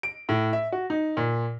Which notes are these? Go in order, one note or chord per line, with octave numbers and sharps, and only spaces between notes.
D7
A2
E5
F#4
D#4
A#2